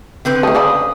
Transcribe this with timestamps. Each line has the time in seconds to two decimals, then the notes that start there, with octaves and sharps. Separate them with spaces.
0.25 D3 C4 B4
0.43 D#3 A3 D#6
0.55 C#3 D5 B5